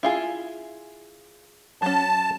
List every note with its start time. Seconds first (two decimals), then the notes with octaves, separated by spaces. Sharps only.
0.03 E4 F4 G#4
1.82 F#3 C#4 A5